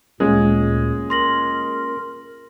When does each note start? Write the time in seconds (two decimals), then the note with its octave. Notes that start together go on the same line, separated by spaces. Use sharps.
0.20 D2 A#2 G#3 A#3 C#4 F4
1.10 A#4 C6 A#6 F#7